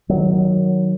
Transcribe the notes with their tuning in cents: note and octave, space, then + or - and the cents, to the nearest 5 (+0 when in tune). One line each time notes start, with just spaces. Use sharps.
D#3 +0 F#3 +0